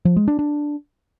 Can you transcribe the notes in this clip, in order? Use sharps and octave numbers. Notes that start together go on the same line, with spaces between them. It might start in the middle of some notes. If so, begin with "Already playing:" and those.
F3
G#3
D4
D4